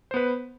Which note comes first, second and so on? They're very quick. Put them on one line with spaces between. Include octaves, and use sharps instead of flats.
C5 B3 B4